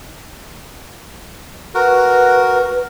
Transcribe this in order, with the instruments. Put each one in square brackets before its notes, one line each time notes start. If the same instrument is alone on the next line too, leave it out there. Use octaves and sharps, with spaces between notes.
[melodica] F#4 A#4 [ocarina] B4